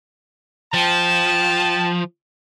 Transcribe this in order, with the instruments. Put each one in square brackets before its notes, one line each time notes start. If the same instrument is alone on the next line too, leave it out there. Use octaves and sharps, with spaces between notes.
[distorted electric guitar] F3 [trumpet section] G5 A5